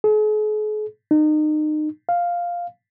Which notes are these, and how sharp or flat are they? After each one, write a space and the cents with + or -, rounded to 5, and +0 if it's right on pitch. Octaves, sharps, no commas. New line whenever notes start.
G#4 +45
D#4 -30
F5 +0